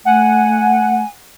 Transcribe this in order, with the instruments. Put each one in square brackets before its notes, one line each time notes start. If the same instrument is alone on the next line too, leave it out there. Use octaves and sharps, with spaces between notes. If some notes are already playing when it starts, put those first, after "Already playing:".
[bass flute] A3 [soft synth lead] F#5 [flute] G#5